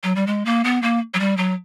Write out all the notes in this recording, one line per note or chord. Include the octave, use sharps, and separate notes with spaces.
F#3
G3
G#3
A#3
B3
A#3
F#3
G3
F#3